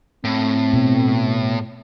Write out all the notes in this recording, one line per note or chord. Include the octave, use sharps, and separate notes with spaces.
A2 C4
B2